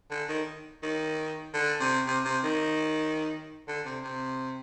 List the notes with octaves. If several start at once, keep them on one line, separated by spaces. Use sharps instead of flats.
D3
D#3
D#3
D3
C3
C3
C3
D#3
D3
C3
C3